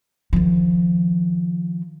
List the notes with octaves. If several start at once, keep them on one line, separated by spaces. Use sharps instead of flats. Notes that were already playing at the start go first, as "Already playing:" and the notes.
D#3 F3